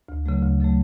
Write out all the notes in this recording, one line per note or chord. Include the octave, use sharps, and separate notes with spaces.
D2
C#3 F#3 A3
D2
C#3 F#3 A3